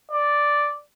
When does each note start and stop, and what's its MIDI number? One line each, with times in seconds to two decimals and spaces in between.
0.12 0.78 74